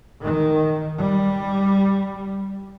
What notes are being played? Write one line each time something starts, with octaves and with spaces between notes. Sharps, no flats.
D#3
G3